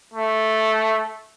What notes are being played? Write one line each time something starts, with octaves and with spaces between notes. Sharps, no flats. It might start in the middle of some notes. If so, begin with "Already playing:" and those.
A3